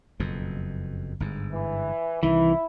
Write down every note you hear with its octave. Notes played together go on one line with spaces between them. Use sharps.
F#1 F2 B2
G1 G#2
E3
C2 D#3 E3 E4